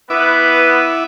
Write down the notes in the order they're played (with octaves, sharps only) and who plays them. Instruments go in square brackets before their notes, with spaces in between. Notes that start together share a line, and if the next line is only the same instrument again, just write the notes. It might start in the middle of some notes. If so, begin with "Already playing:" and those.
[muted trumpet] B3 [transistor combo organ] E4 E5 D6 [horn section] B4